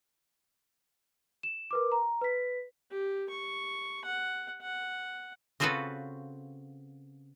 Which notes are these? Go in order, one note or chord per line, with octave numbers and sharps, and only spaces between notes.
E7
A#4 B4 D6
A#5
B4 B6
G4
C#6
F#5
F#5
C#3 C4 F4 F#4 A4 B4